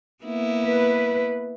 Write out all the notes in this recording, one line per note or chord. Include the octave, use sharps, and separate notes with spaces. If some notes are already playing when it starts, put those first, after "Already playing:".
A#3 B3 E4
B4